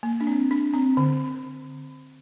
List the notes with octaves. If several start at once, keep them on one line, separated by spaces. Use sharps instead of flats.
A#3
D4
C4
D4
C4
D3